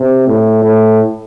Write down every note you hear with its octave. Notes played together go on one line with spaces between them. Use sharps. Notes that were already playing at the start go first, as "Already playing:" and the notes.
Already playing: C3
A2
A2